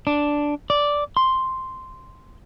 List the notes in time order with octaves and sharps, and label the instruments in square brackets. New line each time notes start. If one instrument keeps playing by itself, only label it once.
[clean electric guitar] D4
D5
C6